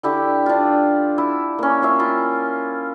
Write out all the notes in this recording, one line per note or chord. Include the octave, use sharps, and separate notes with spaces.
D3 E4 G4
D4 F4
E4
A#3 C#4
F4 C#5 E5
E4 F4